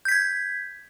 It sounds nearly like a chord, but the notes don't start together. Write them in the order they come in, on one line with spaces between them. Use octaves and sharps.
G6 B6 G#6